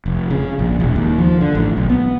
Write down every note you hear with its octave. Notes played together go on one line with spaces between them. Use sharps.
F1
C#3
A#1
E1
D#2
F3
D3
A1
B1
B3